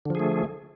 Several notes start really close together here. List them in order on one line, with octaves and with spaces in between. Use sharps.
D3 F3 G#4 A3